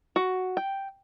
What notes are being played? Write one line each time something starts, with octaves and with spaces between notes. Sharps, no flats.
F#4
G5